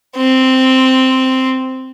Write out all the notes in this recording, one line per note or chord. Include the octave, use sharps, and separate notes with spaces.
C4